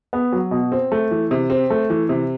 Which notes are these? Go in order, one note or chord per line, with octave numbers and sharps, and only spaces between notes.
B3
F#3
B2
C4
A3
E3
C3
C4
A3
E3
C3